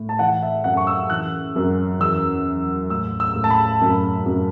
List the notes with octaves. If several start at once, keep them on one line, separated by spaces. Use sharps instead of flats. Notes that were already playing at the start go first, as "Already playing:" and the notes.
Already playing: A2
A5
E3 F#5
E5
F#2 F#5
C#6
E6
E3 F#6
F#2
E2 E6
E2
A2 E6
E6
A2
A5
B5
F#2
F#2